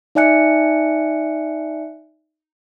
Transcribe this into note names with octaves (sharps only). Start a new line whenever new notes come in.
D#4 D5 E5 G#5 F#6 C#7